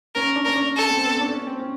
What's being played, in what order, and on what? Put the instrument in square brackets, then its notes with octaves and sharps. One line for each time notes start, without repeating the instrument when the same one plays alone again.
[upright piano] C#4 [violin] A#4
[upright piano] D4
[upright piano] C#4 [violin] A#4
[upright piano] D4
[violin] A4
[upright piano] C4
B3
D4
C#4
C4
C#4